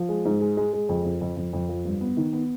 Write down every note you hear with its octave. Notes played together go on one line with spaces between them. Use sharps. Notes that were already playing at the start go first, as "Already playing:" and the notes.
Already playing: F3
G#3
G#2
G#3
G#3
G#3
F2
F2
F2
F2
F2
F3
G2
B3
D#3
B3